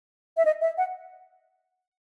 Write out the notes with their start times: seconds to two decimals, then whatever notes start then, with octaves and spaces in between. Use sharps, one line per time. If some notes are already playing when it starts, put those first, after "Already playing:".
0.37 E5
0.45 D#5
0.61 E5
0.78 F#5